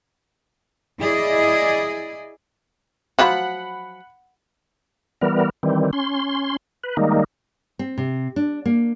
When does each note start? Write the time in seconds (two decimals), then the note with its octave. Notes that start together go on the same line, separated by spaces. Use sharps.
1.00 E4 G#4 D5 D#5
3.19 F3 F#3 F4 F#5 B5
5.21 E3 G3 B3 A#4
5.63 D#3 E3 G3 C4
5.93 C#4 C6
6.84 B4
6.97 D#3 G3 G#3 A#3 D#4
7.79 C4
7.98 C3
8.36 D4
8.66 A#3